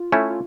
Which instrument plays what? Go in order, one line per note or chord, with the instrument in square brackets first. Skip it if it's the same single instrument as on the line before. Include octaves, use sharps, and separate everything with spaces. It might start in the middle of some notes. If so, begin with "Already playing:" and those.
Already playing: [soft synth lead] F4
[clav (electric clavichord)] A3 C#4 E4
[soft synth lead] F4